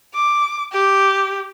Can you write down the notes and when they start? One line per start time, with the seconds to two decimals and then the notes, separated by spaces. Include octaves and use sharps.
0.14 D6
0.72 G4